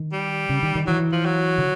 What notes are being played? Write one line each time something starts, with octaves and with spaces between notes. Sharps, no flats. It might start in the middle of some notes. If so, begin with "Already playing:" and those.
Already playing: D#3
G3
C#3
D#3
D#3
E3 F#3
F3
F#3
D3